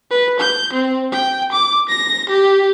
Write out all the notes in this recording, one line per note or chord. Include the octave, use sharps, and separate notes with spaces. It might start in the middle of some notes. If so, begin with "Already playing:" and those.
B4
G6
C4
G5
D6
A#6
G4